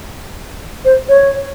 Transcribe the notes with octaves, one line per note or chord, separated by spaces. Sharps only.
C5
C#5